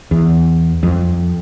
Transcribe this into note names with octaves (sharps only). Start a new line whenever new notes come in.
E2
F2